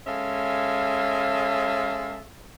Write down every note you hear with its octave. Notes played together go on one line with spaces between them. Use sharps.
G#3 C#4 A4 E5 F5